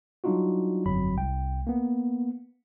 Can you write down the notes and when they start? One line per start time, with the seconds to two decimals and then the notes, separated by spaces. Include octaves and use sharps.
0.24 F#3 G3 D4 D#4 F4 F#4
0.86 G1 F2 F#3 B5
1.17 C2 G5
1.67 A#3 B3